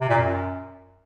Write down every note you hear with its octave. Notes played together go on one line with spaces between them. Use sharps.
C3
A#2
F#2